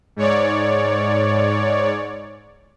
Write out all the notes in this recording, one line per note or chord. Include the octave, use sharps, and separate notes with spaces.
G#2 C#5 D5